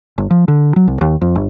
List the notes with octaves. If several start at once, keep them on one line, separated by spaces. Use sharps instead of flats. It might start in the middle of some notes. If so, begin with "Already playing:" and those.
G1
F3
D3
F#3
C2
D#2
F2
G1